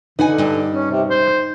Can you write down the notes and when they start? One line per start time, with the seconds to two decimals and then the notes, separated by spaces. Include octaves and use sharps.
0.19 D3 D#4 B4 F#5 G#5
0.38 G2
0.73 C#4
0.90 C3
1.09 C5
1.27 G6